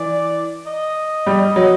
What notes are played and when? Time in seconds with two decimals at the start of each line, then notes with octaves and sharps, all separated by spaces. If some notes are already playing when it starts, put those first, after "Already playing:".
Already playing: E3 D5
0.66 D#5
1.26 G3
1.56 F#3